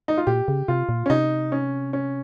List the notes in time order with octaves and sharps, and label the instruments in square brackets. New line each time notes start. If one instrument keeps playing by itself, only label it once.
[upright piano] D#4
F4
[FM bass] A#2 [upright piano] G4
[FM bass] C#3
[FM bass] C3 [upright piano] F4
[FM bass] A#2
[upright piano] C#4
[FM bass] C3 [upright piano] D#4
[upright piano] C#4
C#4